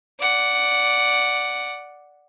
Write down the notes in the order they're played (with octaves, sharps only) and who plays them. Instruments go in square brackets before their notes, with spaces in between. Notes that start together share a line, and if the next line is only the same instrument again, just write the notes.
[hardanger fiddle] D5 F#5